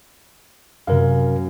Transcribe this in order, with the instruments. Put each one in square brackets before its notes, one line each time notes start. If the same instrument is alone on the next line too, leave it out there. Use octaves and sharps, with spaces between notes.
[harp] F#2 [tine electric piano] C3 A#4 F5